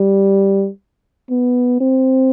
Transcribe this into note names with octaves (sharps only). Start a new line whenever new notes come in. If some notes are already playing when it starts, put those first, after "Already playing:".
Already playing: G3
B3
C4